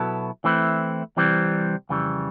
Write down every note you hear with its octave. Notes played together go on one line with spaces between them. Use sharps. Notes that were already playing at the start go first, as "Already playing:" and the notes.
Already playing: B2 F#3 B3 E4 A4
E3 A3 C4 E4
C2 C3 E3 G3 C4
F2 C#3 E3 G3